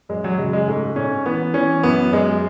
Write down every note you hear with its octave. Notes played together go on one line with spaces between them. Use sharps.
F#2 G#3
F#3
C#3 G#3
G#3
G#2 A3
G#2 C#4
E3 B3
E3 C#4
F#2 B3
F#2 G#3